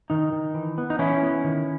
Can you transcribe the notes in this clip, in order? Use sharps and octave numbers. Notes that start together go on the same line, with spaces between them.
D#3 D#4
D#3
E3
B3
D#4
E3 C#4 E4
B3
D#3